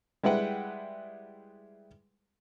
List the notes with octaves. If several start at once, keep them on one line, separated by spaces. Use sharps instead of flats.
G3 G#3 E4 B4 F#5 G5